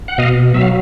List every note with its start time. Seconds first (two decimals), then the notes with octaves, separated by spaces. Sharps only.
0.08 F#5
0.18 B2 D#5 F5
0.54 F#3 E5
0.61 F5